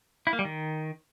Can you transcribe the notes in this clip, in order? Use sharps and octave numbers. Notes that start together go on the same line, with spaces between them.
E4
A#3
G3
D#3